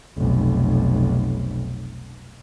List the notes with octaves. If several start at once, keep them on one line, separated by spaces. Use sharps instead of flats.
F1 B1